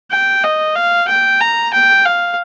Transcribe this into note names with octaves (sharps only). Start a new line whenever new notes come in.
G5
D#5
F5
G5
A#5
G5
F5